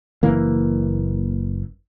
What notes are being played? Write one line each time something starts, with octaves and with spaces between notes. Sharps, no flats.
F#1 E3 A#3